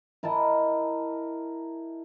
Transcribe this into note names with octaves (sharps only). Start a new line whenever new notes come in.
E4 A#4 D#5 A5